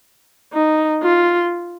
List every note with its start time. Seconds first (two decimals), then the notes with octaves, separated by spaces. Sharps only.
0.53 D#4
1.03 F4